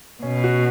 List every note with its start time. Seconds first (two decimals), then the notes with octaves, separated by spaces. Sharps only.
0.23 B2 C#4
0.44 F#4